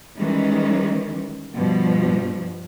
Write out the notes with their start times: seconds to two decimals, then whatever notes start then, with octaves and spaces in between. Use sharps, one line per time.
0.18 D#3 E3 G3 G#3 C#4
1.54 G2 B2 F3